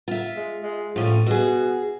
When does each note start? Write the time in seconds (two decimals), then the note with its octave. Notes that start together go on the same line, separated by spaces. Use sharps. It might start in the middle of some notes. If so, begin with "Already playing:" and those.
0.08 F4 E5
0.36 G#3
0.63 G#3
0.96 A2 F3 C#4
1.26 B2 F#4 G#4